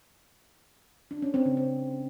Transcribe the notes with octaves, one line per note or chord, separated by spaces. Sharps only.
D4
C#4
C4
C#3
C4